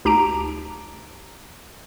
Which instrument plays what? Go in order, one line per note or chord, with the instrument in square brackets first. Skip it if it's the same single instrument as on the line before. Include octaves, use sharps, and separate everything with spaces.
[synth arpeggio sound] D2 D#4 G4 A5 A#5 D7